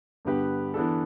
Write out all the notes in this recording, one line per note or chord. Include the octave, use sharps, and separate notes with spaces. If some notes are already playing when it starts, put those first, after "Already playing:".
G2 D3 B3 G4 B4
E3 B3 D4 A4